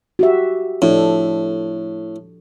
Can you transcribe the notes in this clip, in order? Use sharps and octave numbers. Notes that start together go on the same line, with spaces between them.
F#4 G4 E5
A2 F3 D4 A4